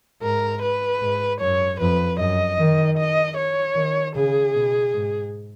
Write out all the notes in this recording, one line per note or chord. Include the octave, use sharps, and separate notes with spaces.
G#2 A#4
B4
G#2
F#2 C#5
F2 B4
F#2 D#5
D#3
D#5
C#5
D#3
C#3 G#4
B2
G#2